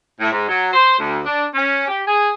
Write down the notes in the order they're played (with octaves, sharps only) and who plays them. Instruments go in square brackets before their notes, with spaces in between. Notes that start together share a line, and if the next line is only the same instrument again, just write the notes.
[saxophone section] A2
G#2
F#3
C5
D2
D4
C#4
G4
G#4